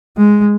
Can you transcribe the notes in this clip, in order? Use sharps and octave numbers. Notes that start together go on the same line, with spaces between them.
G#3